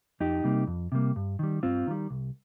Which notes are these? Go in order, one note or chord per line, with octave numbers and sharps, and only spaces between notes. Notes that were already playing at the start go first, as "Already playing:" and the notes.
F2 D#4 G4
C3 G3 A#3
F2
C3 G3 A#3
G2
D#3 G3
G2 C4 F4
D#3 G3
C2